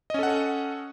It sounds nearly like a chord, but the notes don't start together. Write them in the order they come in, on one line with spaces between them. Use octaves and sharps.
D#5 C#4 A4 F#5